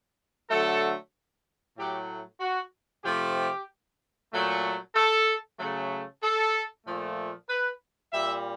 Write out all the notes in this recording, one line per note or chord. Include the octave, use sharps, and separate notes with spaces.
D3 F#3 A3 A4
A2 F#3 A3 G4
F#4
C3 F3 A3 G4
A#2 F#3 A3
A4
C#3 F#3 A3
A4
A#2 F3 A3
B4
A#2 G3 E5